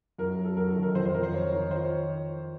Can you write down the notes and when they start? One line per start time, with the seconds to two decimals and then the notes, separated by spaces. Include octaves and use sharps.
0.18 F#2 A#4
0.38 F#3
0.45 A4
0.57 F#2 A#4
0.70 A4
0.77 D#3
0.83 A#4
0.95 F2 C5
1.05 C5
1.14 F2 A#4
1.23 C5
1.33 F2 C#5
1.53 D#3
1.71 F3 C5
1.84 C#5